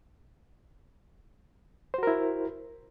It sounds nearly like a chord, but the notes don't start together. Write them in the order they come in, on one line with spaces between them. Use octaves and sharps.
C5 F#4 A#4 E4